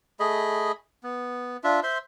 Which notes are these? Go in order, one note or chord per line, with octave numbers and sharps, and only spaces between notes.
A3 G#4 D#5 B5
B3
D4 F4 E5
C5 E5 C6